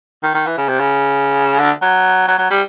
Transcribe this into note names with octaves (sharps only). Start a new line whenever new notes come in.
D#3
D#3
E3
C#3
C3
C#3
D3
F#3
F#3
F#3
G3